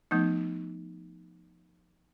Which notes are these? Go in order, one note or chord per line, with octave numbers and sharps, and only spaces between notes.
F3 A3 B3 D#4